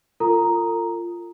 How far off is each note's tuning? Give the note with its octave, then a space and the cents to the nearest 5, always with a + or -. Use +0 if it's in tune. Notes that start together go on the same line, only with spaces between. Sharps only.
F4 -10 A4 +45 A#5 +0